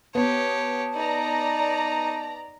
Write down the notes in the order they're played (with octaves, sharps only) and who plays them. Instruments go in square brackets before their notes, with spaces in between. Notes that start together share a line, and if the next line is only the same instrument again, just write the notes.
[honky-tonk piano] B3 [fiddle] G4 C#5 [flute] A5
[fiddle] D#4 [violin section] D5 A#5